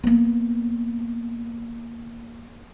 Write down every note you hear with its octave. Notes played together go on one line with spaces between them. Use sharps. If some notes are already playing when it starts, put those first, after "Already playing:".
A#3 B3